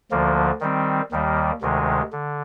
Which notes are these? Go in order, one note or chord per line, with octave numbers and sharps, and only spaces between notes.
D2 D3 F3 A#3
D#3 G3 C4
D#2 D#3 G3 A#3
D2 C3 D#3 G#3
D3